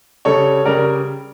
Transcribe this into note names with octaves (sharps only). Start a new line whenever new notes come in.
C#3 G3 A4 C#5
C#3 G3 A#4 D5